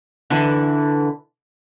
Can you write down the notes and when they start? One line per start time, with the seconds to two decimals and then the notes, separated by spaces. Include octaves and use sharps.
0.30 D3 E3